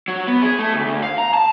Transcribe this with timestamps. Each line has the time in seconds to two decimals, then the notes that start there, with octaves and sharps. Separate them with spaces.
0.08 F#3
0.27 B3
0.42 G#4
0.59 A3
0.73 D2
0.87 D2
1.03 F5
1.18 A#5
1.34 A5